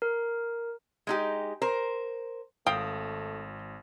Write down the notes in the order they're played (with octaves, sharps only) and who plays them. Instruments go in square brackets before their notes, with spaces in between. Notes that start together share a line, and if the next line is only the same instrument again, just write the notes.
[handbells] A#4
[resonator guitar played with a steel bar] G#3 D#4 G4
A#4 C5
[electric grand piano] G#1 [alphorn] A3 [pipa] F5 G5 [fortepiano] D#6